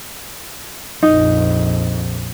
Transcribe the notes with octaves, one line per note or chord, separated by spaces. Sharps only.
A#1 F2 D#4